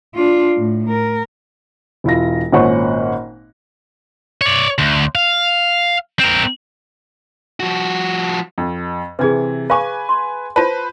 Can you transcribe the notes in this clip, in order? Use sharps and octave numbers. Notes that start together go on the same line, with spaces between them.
D4 F4
A2
A#4
E1 E4 F4 A#6
G#1 A#2 C#4 C5 F#5 C#6
C#5 D5
D2
F5
C4 A#4
F3 F#4
F2
C3 E3 G#4 B4 G#6
B4 F5 G#5 C#6 D6
C6
F4 B4 C5 A5